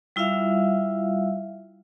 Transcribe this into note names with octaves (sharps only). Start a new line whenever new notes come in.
G3 E4 F4 E5 F5